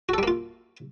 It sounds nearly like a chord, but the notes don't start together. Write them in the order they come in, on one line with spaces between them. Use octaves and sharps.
F#4 A4 G3 A#3 F4